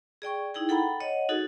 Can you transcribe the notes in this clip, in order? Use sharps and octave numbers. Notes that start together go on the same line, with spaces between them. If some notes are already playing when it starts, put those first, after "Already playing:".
G#4 D5 G5 C#6
D#4 E4 G#4 G5
A4 F#5 G5 A#5 B5
C#5 D#5 F#5
D#4 F#4 G#4 A4